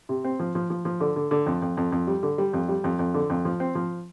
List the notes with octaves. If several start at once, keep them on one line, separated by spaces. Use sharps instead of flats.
C3
C4
F3
F3
F3
F3
D3
D3
D3
F2
F2
F2
F2
G3
D3
G3
F2
G3
F2
F2
D3
F2
F3
C4
F3